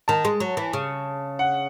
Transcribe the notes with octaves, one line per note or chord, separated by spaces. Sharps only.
D#3 A5
G#3
F#3
E3
C#3
F#5